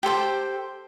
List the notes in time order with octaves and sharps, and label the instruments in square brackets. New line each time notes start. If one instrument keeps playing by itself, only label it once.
[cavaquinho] G4 A4 C5 G5